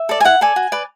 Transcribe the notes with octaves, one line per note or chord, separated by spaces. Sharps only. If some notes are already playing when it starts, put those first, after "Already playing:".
Already playing: E5
A4 D5
G#5
E4 F#5
A4 D5 G#5
F#4
B4 D5